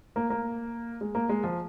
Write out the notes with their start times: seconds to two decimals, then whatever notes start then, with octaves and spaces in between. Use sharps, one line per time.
0.16 A#3
0.30 A#3
1.01 G#3
1.15 A#3
1.29 G#3
1.44 F3